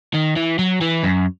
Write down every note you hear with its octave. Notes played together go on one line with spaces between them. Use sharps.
D#3
E3
F#3
E3
F#2